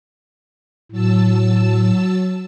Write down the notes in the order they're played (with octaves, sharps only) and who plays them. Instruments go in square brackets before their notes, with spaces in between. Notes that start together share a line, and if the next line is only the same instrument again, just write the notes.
[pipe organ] A2 [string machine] F#3 A5 E6